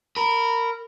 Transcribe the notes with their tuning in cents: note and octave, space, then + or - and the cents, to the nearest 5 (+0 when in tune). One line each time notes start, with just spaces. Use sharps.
A#4 -15 B5 +0